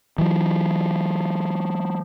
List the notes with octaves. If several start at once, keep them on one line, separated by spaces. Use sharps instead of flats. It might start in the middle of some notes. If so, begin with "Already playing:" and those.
E3 F#3